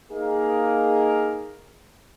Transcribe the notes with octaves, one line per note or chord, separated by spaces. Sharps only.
A#3 D#4 G#4 A#4